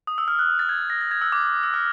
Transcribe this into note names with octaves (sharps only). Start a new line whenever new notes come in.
D#6
E6
F6
F#6
A6
G#6
A#6
A6
G#6
E6
D6
E6
F6